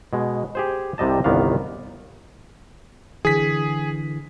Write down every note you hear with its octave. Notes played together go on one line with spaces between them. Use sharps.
B2 G#3
G4 G#4 C5
C2 C3 G3 D#5 A5
G1 C2 D#3 B3 D5 F5
D3 E3 G#4 B6